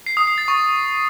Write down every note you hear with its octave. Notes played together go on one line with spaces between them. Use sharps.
C7
D#6
C7
A6
C#6